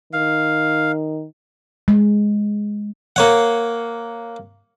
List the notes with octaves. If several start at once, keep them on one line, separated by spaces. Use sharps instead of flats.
D#3 F5
G#3
A#3 C#5 F#5